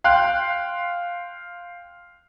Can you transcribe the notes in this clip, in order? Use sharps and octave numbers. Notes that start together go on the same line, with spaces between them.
F5 G5 C6 F#6